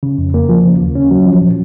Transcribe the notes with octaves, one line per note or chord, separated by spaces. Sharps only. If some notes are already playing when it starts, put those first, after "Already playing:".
C#3
F2
A#3
F3
C#3
D#2
C#4
F#3
F3
A#2